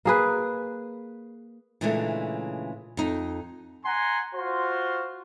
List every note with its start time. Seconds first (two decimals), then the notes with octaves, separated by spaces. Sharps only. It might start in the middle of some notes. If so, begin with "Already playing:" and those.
0.05 A#3 G#4 B4
1.81 A#2 C#3 E3 G#3 A3 D4
2.97 F2 D#4
3.85 F#5 G#5 A#5 C6
4.34 F4 F#4 C5 C6